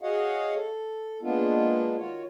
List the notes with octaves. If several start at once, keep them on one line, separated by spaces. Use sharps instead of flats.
F#4 G#4 C#5 D#5 F5 F#5
A4
G#3 A#3 B3 D4 F4
D#3 F4 F#4 C#5